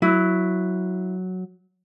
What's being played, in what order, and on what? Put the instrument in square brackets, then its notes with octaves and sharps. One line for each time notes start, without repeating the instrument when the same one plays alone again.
[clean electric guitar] F#3 [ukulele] E4